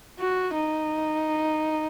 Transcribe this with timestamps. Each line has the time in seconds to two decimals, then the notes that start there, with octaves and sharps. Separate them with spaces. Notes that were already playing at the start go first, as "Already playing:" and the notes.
0.19 F#4
0.54 D#4